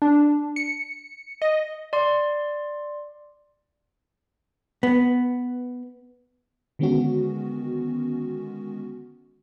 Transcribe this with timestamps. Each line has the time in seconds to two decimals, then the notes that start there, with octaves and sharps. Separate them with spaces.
0.02 D4
0.56 C#7
1.42 D#5
1.93 D5 C6
4.83 B3
6.79 D3 D#3 G#3 B3 C#4 F#4